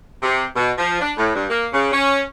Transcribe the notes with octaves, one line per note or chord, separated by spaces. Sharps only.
C3
B2
F3
D4
A2
G2
A#3
C#3
C#4